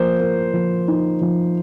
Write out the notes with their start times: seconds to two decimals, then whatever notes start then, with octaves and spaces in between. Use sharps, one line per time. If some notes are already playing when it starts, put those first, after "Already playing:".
Already playing: F3 A#3 C5
0.20 A#3
0.53 F3
0.88 D#4
1.21 F3